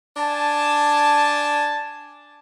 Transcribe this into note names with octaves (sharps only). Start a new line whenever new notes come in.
D4 G#5 A5